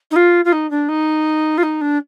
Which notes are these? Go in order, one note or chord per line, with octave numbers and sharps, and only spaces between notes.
D#4
F4
F4
D#4
D4
D#4
F4
D#4
D4